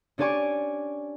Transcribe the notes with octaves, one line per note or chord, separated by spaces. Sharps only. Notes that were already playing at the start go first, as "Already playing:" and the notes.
C#4 D4 G4 D5 G#5 C#6